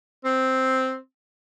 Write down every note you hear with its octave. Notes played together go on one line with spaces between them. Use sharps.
C4